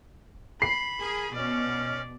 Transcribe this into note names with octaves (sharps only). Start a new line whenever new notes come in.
B5 C7
G#4 A#4 A5
B2 C#4 D5 D#5 F6